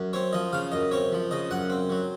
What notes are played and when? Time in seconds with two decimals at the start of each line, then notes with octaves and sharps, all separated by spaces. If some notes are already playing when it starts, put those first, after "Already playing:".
Already playing: F#2
0.13 C4 C#5
0.33 F3 D#5
0.53 C#3 F5
0.72 F#2 D#5
0.91 C4 C#5
1.12 F3
1.31 C#3 D#5
1.50 F#2 F#5
1.70 C4
1.90 F#3